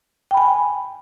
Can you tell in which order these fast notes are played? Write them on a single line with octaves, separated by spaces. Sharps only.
G5 B5 G#5